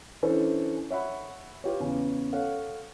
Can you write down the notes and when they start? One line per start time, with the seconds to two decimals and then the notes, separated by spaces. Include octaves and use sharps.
0.23 E3 C#4 D4 E4 A4 C5
0.90 C#5 E5 F#5 B5
1.64 F4 G4 B4 C#5
1.80 E2 C#3 C#4
2.33 A4 C#5 F5 F#5